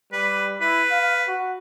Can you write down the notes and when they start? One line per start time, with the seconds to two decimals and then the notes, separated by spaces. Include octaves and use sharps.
0.13 G3 B4
0.61 E4 B4
0.91 F5
1.28 F#4